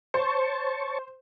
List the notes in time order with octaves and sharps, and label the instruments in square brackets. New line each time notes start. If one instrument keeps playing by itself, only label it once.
[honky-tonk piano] C5 [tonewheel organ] C#5 A5 C#6